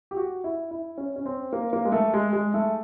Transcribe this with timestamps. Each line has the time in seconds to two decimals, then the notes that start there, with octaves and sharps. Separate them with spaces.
0.11 G4
0.16 F#4
0.44 E4
0.71 E4
0.98 C#4
1.16 C#4
1.26 C4
1.53 A#3
1.73 A#3
1.85 G#3
1.92 A3
2.14 G#3
2.33 G#3
2.54 A3